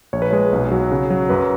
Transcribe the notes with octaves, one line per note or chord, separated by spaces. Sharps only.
A#1 C#5
B4
G#3 C#5
B1
F#3
C#3
F#3
F#2 B4